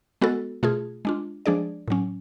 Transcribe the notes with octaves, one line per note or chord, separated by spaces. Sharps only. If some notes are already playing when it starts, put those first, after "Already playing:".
G#3 B3 F#4 A4
B2 A3 F4 G#4
G#3 D4 F4
F3 G#3 D4 G#4 D5
A2 F#3 C#4